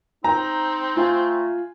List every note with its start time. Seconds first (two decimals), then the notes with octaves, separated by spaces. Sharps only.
0.24 C4 D#4 A#5
0.97 A3 F4 G#5